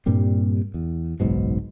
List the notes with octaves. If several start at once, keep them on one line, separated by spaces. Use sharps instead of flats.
G2 A#2 G3 C4
E2
F#1 B1 G#2 B2